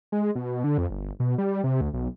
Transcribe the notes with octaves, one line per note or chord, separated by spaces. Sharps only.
G#3
B2
D3
F2
G1
B2
G3
C3
D2
B1